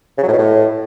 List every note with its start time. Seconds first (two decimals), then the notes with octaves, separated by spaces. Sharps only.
0.18 C#3
0.23 F#3
0.28 A2
0.33 B2
0.38 A2